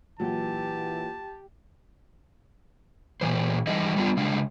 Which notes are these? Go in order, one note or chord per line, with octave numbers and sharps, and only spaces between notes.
A#2 E3 F#3 G4 A5
A#2 E3 C5
E3 G3 D#4 G#4 D#5
G3 B3 D4 F4
C#3 G#3 D4 F5